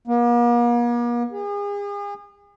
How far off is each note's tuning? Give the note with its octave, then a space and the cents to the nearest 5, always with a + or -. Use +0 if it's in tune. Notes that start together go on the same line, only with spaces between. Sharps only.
A#3 +45
G#4 -40